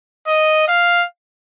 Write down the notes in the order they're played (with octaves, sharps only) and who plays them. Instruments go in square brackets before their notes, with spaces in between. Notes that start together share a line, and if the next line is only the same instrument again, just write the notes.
[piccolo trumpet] D#5
F5